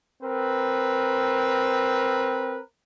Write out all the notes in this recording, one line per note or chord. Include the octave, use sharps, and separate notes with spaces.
C4 A#4 B4